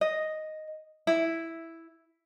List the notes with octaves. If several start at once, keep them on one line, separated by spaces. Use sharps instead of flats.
D#5
E4